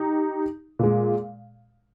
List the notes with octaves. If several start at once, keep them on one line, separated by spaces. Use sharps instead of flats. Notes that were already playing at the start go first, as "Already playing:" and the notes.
Already playing: D#4 G4
A#2 G#3